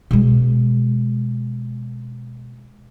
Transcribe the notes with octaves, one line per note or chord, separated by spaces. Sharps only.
B2 G#3